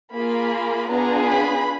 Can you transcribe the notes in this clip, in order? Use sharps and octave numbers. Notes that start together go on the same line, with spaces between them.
A#3 F4 G#4 B5
B3 D4 F4 G#4 A#5
B5